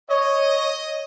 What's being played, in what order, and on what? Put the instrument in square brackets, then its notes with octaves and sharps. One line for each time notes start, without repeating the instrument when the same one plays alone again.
[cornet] C#5 [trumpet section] D#5